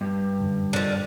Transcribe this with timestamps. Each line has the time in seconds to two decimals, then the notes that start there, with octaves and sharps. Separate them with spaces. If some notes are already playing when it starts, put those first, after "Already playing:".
0.01 G2
0.39 F#2 D3 E3
0.73 D3 F3 A#4 D5 D#5